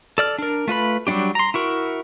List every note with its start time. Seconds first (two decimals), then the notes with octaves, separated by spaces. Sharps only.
0.18 A4 D5 F6
0.38 D4 A#4
0.68 A3 F4 B4 B5
1.07 F#3 G3 B3 D4 G4
1.35 A#5 C6
1.54 E4 F#4 A#4